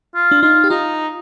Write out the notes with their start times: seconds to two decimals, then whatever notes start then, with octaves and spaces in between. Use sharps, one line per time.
0.15 F4
0.31 D4
0.42 D#4 F4
0.64 G4
0.70 D#4 F4